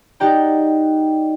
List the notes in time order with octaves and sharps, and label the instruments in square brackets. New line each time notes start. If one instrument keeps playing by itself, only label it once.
[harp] D#4 F#4 G4 D5 G5 A#5